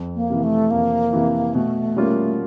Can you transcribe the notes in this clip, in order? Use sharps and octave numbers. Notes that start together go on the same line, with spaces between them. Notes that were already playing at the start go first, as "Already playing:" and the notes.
Already playing: F2
A#3
C3 E3
A3
F2 A#3
C3 E3
B2 A3
G3 A#3 C#4 F4